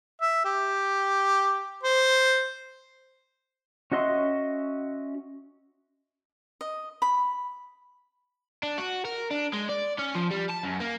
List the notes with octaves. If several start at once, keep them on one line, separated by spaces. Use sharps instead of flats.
E5
G4
C5
C#4 F#4 D#5 E5 C6
D#5
B5
D4
F#4
A#4
D4
G#3
D5
C#4
F3
G3
A5
F#2
A#3